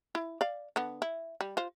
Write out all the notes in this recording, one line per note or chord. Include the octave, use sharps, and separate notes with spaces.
E4
D5 F5
D3 B3
E4
G3
F4 C5